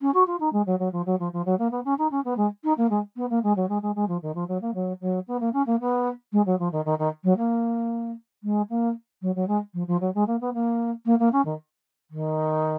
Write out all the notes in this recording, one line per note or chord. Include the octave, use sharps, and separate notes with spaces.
C#4
F#4
F4
D#4
G#3
F#3
F#3
F3
F#3
F3
F3
F#3
A#3
B3
C#4
D#4
C#4
B3
G#3
D#4
A#3
G#3
B3
A#3
G#3
F#3
G#3
G#3
G#3
F3
D#3
F3
F#3
A#3
F#3
F#3
B3
A#3
C#4
A#3
B3
G#3
F#3
F3
D#3
D#3
D#3
F#3
A#3
G#3
A#3
F#3
F#3
G#3
F3
F3
F#3
G#3
A#3
B3
A#3
A#3
A#3
C#4
D#3
D#3